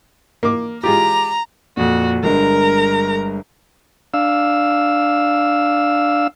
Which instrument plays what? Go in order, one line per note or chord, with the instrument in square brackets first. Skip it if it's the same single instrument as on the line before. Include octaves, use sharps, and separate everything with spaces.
[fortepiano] A#3 D6
[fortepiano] G#3 F4 G4 [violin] A#5
[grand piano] F2 A#2 [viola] F#4
[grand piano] G1 G2 G#3 [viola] A#4 A#5
[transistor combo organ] D4 F5 E6